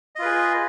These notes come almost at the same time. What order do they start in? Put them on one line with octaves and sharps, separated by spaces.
D#5 F4 B4 G#4